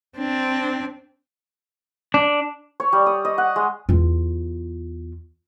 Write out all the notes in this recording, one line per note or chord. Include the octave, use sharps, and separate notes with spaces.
C4 D4
D4
C#5
G3
D#6
D#5
F#5
G#3
E2 F4